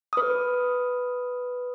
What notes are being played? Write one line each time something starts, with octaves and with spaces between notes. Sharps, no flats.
B4 D#6